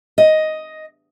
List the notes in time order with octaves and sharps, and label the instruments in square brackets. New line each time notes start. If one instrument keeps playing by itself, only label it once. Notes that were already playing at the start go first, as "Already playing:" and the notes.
[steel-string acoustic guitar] D#5